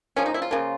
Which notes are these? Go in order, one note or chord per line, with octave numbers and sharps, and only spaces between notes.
C#3 F3 A#3 C#4
D#4
E4
F4
C#3 F3 A#3